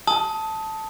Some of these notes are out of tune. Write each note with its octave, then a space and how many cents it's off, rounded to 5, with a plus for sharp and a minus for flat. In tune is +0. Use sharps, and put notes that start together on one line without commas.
A5 +0 D#6 +25